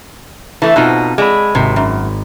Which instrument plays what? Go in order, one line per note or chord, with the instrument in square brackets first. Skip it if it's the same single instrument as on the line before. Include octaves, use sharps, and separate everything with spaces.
[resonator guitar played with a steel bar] E3 A3 [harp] A5 E6
[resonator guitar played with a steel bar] B2 D#4 [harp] C4 F4 F#5
[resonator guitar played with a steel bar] G#3 [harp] D5 E5 B5
[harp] G#1 [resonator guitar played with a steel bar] C3
[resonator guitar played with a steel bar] F#2